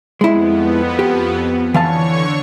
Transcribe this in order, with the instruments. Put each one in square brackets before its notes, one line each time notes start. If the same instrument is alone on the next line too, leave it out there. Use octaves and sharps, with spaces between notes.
[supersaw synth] F2 B3 [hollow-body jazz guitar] G#3 E4
[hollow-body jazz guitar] G4
[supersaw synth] D3 C#5 C#6 [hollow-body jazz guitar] E3 F5 A5